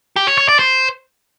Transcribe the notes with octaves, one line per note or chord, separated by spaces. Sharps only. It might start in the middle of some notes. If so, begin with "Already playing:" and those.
G4
C#5
C#5
D5
C5